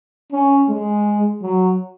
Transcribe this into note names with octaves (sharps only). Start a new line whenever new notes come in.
C#4
G#3
F#3